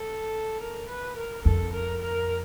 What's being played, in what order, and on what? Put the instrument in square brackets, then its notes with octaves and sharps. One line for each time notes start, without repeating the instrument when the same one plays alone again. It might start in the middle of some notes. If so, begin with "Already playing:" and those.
Already playing: [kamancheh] A4
A#4
B4
A#4
[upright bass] F2 [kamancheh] A4
[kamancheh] A#4
A#4